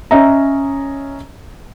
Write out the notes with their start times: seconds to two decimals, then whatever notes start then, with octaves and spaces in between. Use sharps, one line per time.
0.11 C#4 D#5 E5 A#5